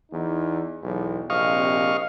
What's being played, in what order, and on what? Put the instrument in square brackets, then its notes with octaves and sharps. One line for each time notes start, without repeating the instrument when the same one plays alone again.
[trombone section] E2 D#4
B1 E2
[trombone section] A#1 C3 [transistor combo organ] D#5 F5 C#6